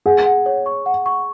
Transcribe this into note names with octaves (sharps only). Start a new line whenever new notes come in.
G#4 F#5
F#5
C#5
C#6
F#5
C#6